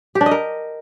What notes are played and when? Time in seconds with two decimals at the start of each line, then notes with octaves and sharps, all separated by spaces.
0.15 G4
0.21 D4
0.26 D#5
0.31 A#4